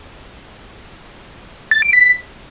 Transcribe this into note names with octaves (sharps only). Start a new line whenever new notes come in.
A6
D7
B6